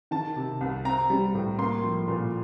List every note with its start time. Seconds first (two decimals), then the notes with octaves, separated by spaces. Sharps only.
0.11 D#3 A5
0.36 C3
0.61 C2
0.85 C4 A#5
1.10 G3
1.35 A2
1.58 A#3 C6
1.84 F3
2.08 A#2